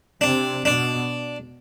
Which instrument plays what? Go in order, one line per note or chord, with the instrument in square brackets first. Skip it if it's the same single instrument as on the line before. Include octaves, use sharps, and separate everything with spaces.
[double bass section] C3 [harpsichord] D4
[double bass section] B2 [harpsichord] D4